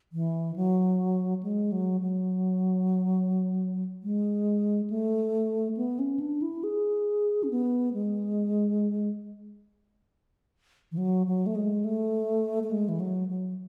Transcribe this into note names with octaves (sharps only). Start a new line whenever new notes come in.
E3
F#3
G#3
F#3
F#3
G#3
A3
B3
C#4
D4
E4
G#4
C#4
B3
G#3
E3
F#3
F#3
A3
G#3
A3
A3
G#3
E3
F#3
F#3